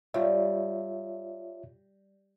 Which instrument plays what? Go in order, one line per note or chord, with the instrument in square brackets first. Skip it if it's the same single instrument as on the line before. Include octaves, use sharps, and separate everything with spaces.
[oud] G3 [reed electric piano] F4 C#5 E5